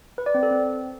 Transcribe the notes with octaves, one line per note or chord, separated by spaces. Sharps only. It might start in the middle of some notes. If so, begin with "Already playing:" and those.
B4
D5
C4
A4
C4